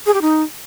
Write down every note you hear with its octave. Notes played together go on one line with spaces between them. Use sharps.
G#4
G4
D#4